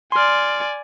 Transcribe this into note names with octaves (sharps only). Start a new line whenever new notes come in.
D5 G#5 C6 F6